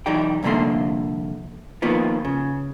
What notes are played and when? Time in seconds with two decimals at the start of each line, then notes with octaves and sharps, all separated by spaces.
0.06 B1 E3 D#4 G4 D5 G5
0.43 C2 F2 D3 A3 A#3 C6
1.82 D#3 F3 A#3 B3 F4
2.25 C#3